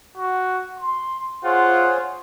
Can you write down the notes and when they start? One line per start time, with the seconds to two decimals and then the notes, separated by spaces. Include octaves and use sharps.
0.17 F#4
0.79 C6
1.44 F4 G#4 C5 C#5 F#5